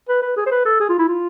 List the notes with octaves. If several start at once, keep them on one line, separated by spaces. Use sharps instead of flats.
B4
B4
G#4
C5
B4
A4
G#4
F4
E4
F4